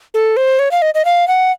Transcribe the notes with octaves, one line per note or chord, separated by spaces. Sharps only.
A4
C5
C#5
F5
D#5
D#5
F5
F#5